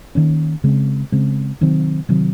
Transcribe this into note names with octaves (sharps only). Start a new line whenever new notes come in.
D#3 A#3 C#4
C#3 G#3 C4
C#3 G#3 C4
C3 D#3 F#3 C4
C3 D#3 F#3 C4